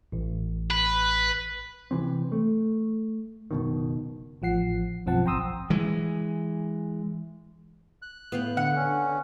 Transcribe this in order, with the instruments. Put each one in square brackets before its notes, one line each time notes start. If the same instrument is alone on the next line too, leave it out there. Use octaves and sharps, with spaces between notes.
[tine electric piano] A1
[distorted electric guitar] B4
[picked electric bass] C3 E3 C4
A3
F#1 B2 D#3
[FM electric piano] A1 F3 F#5 C7
B1 F#2 F3 C4 F#5 A5
G#1 G5 A#5 C6 D#6 E6
[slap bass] E3 G#3
[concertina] F#6
[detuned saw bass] A2 [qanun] B3 F5 G5
[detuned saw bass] D3 [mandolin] F#5
[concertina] C#4